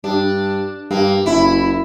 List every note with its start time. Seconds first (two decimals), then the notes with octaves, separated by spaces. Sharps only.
0.04 G2 D4
0.91 G2 A#3
1.26 F#1 E4